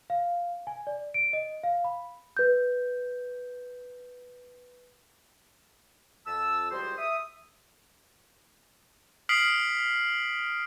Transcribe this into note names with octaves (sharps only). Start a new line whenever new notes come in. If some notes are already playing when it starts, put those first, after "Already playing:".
F5
G#5
D5
D7
D#5
F5
B5
B4 G6
F2 A5 E6
C#2 G3 F#4 G#4 C5
E5 D#6
D#6 F6 B6 C7 D7 F#7